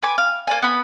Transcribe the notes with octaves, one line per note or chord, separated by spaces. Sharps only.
B4 G#5 D6
F5
A#3 D5 G#5
B3 B5